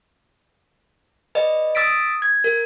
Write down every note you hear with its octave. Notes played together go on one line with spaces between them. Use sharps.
B4 D5 D#5
D#6 E6 A6 B6 D7
G#6
A#4